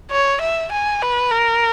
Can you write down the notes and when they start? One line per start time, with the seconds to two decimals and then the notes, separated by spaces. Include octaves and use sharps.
0.11 C#5
0.41 E5
0.72 G#5
1.02 B4
1.31 A#4